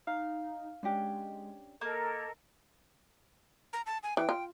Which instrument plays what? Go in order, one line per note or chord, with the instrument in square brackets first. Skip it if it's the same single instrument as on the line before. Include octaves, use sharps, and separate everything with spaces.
[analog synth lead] D#4 [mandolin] F5
[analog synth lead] G#3 [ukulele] C#4 D4 G4
[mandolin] A#3 [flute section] A4 A#4 D#5 [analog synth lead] A#5
[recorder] A#5
A5
G#5
[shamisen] E3 [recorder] G5
[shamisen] F4